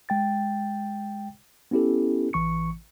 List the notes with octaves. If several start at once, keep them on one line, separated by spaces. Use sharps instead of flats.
G#3 G5 A6
B3 C#4 E4 G4 A4
A1 E3 C#6 C#7